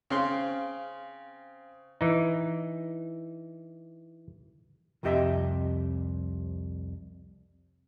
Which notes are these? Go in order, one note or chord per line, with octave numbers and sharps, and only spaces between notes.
C#3 C4 F5 C6
E3 D#4
C2 F2 C3 G4 D#5 E5